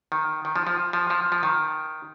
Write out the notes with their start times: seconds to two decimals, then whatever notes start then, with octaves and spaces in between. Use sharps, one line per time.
0.12 D#3
0.45 D#3
0.56 F3
0.67 F3
0.93 F3
1.10 F3
1.32 F3
1.43 D#3